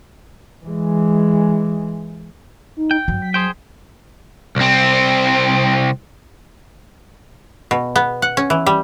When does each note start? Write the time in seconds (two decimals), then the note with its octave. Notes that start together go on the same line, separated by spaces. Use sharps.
0.65 E3 G#3
2.77 D#4
2.91 G5
3.08 G2 F#3
3.22 B6
3.34 G#4 C5 G5
4.56 C2 C4
7.71 B2
7.96 B3
8.22 F#5
8.37 C#4
8.50 E3
8.66 G3